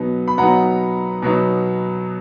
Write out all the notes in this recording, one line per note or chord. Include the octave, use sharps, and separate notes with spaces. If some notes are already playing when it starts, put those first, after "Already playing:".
Already playing: B2 F#3 B3 D#4
B5
B2 F#3 B3 D#4 F#5 A#5
B2 F#3 B3 D#4